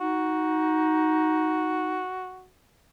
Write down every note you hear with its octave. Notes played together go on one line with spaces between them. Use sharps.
D#4 F#4